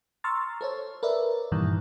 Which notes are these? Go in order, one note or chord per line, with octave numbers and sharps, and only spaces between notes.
A#5 C6 C#6 E6 F6 A6
A4 C5 C#5
A#4 B4 D5 E5
G2 A#2 D#3 E3 G3